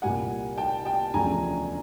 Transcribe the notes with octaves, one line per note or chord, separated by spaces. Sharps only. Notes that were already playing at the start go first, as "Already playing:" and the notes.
C2 A#2 G3 A#3 F#5 G#5
G5 A5
G5 A5
E1 D2 C#3 F3 A3 G#5 A#5